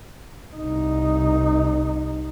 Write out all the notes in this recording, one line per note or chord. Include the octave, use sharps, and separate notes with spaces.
C2 D#4